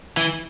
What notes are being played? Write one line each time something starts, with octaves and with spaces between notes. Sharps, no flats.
E3